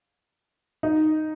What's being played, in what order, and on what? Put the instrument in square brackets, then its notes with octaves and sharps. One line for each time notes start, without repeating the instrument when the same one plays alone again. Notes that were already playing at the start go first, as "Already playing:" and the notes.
[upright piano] D#4